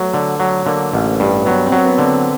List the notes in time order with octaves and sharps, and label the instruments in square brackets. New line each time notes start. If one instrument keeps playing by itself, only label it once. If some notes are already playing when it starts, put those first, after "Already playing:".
Already playing: [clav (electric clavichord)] F#3 [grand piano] A3 B3
[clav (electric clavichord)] D3
F#3
[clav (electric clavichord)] D3 [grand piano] A#3
[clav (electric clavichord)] A1
G2
[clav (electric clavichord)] F#3 [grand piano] B3
[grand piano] C4
[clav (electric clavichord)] F#3
[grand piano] B3
[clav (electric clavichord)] D3
[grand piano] C4